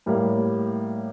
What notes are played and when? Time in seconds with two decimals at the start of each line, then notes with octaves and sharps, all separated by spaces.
0.06 A2 G3 A#3